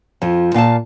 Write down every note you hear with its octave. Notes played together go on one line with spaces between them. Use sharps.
F2 F3
A#2 F5 G#5 A5